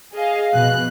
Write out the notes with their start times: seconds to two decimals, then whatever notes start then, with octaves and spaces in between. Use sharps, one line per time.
0.14 G#4 D#5 F5
0.54 B2 F3 F#6